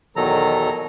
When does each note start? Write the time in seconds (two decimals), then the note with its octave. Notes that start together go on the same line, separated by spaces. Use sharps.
0.16 E2 B2 D#3 F#3 A4 A#5